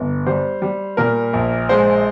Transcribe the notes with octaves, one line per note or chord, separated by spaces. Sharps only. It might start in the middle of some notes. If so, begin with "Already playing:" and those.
Already playing: G1
G3 C5
G3
A#2 A#4
A#1
G#3 C5